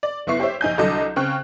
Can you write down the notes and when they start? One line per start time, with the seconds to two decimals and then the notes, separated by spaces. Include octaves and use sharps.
0.03 D5
0.27 F#1 B3 E4 C#6 C7
0.40 G4 C5 C#5 E5
0.61 A#1 D#4 G#5 G6
0.78 C2 D3 F#3 A4 D#5 D6
1.16 C#3 C4 G5 C#6 F#6